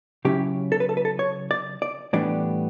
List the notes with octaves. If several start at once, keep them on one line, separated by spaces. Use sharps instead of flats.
C#3 F#3 C#4 E4 G4
A4
B4
A4
B4
A4
C#5
D5
D5
A2 E3 G3 B3 D4 D5